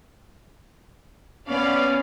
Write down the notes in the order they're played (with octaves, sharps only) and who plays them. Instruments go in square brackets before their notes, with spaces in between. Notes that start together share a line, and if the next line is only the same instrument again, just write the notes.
[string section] B3 D5 F5 [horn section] C#4